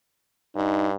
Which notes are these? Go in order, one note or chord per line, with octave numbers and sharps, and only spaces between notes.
G2 D#4